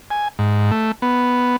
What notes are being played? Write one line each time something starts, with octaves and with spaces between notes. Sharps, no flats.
G#5
G#2
A3
B3